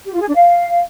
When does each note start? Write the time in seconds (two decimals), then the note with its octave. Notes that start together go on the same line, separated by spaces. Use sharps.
0.07 G4
0.14 F4
0.21 G#4
0.28 D4
0.35 F5